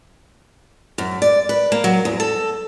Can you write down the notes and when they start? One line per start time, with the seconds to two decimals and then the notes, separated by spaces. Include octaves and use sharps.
0.98 F#2
1.22 D5
1.49 B4
1.72 A#3
1.84 F#3
2.05 E2
2.20 A4